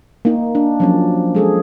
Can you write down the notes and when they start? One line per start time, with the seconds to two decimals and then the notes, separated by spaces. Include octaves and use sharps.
0.25 A#3 D#4
0.55 D4
0.80 F3 F#3 C#4
1.35 G#3 G#4 A4